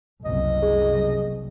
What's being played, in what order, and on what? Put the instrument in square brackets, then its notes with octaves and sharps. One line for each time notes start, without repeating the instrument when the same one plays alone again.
[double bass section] F#1 C2 [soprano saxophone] D#5
[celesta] G#4